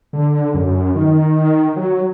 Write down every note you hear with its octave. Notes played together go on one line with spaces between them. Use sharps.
D3
F#2
D#3
F#3